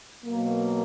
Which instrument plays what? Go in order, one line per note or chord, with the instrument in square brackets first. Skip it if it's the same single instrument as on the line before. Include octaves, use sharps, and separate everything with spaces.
[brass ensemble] B2 F#3 A#3